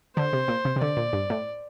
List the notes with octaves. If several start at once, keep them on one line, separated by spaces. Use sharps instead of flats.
D3 C5
C3
A#2
C3
C3
D3 D5
A#2
G2
A2